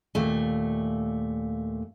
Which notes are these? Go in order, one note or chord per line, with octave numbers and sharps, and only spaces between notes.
D#2 A#2 A3